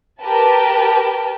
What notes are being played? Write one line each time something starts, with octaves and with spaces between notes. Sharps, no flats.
G4 A#4 B4 G5 A5